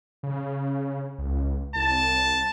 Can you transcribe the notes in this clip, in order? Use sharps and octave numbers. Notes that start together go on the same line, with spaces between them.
C#3
C#2
C2 A5